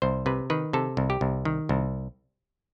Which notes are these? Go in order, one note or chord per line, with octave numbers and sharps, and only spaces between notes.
C2 C5
C3 B4
D#3 B4
C3 A4
C2
G4
C2
D#3
C2